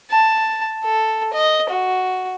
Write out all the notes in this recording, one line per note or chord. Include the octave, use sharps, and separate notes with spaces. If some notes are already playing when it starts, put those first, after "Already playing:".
A5
A4
D#5
F#4